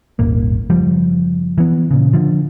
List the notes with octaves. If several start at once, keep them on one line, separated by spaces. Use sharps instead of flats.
D#1 G#1 A#3
F#1 F3 G3
E3 B3
A#2 C#3
D3 F3